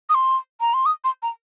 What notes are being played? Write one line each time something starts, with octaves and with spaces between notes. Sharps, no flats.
D#6
C6
A#5
C6
D#6
C6
A#5